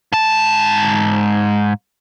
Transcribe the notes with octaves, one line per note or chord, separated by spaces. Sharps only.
G#2 A5